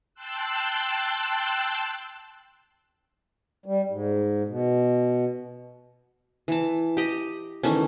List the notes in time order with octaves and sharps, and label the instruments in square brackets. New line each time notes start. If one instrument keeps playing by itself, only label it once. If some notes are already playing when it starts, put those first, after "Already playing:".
[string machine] G5 A5 C6 E6 F#6
[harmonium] G3
G#2
B2
[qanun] E3 A5
G4 D#5
D#3 E3 A3 C#4